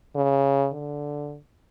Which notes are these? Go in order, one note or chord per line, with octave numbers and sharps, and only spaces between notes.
C#3
D3